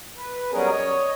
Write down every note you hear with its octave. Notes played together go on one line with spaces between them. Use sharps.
B4
F#3 G3 B3 C#4 G#4 A#4
C#5 D#5